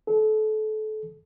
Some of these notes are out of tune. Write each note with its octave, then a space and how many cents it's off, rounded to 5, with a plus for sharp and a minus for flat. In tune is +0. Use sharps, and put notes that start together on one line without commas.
A4 -30